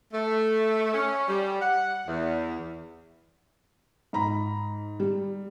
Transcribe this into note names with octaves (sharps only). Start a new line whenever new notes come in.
A3
C#4
G3
F#5
E2
G#2 A#5 B5
G3